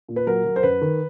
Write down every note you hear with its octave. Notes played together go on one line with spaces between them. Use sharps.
A#2
B4
F#3 A#4
F#3
C5
F#2 B4
D#3